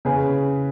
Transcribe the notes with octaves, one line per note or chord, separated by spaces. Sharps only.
C#3 G#4 B4